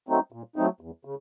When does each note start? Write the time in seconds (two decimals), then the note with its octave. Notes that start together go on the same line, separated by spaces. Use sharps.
0.09 F#3 A3 C4 D#4
0.32 A#2
0.56 F#3 A3 C4 D#4
0.81 E2
1.05 C#3